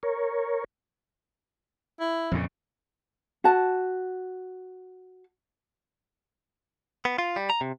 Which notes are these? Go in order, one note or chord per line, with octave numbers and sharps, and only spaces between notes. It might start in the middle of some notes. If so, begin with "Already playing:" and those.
A#4 C#5
E4
F2 A#2 C#3
F#4 A5
B3
F4
G3
A#5
C3